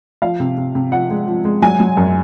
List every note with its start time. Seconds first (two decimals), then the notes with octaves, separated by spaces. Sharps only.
0.22 F3 F5
0.40 C3
0.57 C3
0.75 C3
0.92 F3 F#5
1.10 G#3
1.27 F3
1.45 G#3
1.62 F#3 G#5
1.80 F#3
1.97 F#2